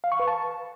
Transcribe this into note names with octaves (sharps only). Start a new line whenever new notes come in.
F5
C#6
B4
A5